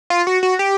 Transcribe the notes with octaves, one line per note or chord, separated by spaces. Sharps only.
F4
F#4
F#4
G4